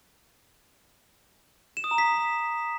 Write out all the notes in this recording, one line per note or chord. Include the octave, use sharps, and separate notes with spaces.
E7
D#6
A#5
B6